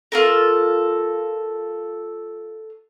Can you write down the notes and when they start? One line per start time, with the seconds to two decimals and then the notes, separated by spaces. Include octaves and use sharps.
0.12 F4 A4 A#4